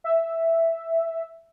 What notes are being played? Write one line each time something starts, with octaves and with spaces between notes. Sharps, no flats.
E5